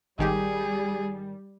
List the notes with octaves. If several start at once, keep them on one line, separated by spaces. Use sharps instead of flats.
G#1 D#3 G3 G4 G#4